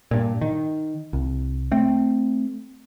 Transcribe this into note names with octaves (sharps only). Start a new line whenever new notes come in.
G2 A#2
D#3
C2
A3 C4